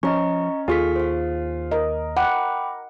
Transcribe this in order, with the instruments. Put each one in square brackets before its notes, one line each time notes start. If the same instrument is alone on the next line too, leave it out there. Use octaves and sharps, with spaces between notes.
[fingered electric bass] F3 [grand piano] C#4 [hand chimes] D#5 A#5 C#6
[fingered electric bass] D#2 [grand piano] F4 G#4 [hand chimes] A4 C#6 B6
[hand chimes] C5 F5
[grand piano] A#4 [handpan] D#5
[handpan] F#5 [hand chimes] G5 B5 D6